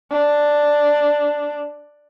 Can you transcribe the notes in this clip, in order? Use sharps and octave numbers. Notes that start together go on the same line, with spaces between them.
D4